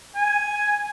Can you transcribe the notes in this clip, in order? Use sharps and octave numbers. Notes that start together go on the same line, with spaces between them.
G#5